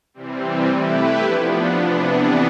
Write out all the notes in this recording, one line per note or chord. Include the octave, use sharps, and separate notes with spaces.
C3 E3 G3 C4
A3 E4 G4 B4
F3 B3 D4
C3 E3 B3 D4